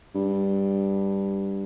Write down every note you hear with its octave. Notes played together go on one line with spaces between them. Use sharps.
G2